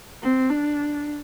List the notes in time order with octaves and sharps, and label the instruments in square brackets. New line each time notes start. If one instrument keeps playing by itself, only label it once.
[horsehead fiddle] C4
D4